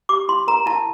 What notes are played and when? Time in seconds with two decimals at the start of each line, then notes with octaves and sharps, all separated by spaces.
0.09 G4 D6
0.28 E4 C6
0.48 A#4 A#5
0.66 E4 A5